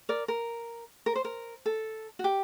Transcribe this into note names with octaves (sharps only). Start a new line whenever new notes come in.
A#4 D5
A#4
A#4
C5
A#4
A4
F#4
G4